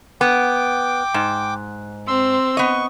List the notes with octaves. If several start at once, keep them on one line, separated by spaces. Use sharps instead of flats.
B3 G5 D6
G#2
C4 C6 E6
B3 D#5 C#6